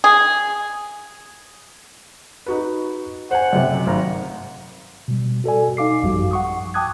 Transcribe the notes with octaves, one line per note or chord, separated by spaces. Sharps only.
G#4
D#4 F#4 B4
C5 F#5 G#5
F#2 C3
G#1 A#5
B2 G3
F#4 A4 D5 G#5
D#4 F5 D6 C7
A1 F#2 F3 G3 F#4 G4
F#5 C#6 D#6
G5 A5 D6 D#6 F#6 G#6